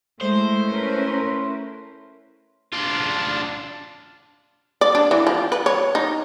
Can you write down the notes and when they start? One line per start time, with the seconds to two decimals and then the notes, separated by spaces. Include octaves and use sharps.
0.21 G#3 A3 E4 C5
0.68 C#4 A#4 B4
2.73 D4 F4
4.81 D5
4.95 D4
5.11 E3
5.27 F3
5.52 B4
5.66 C#5
5.95 D#4